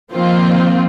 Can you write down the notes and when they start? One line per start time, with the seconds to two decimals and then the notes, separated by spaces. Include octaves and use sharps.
0.12 D#3 F3 A#3 C4 F4